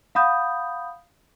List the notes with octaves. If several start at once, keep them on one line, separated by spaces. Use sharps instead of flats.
F5 F#5 B5 D#6 G6